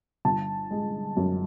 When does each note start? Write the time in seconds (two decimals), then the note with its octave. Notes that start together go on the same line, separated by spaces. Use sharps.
0.25 G1 A5
0.71 G#3
1.17 F#2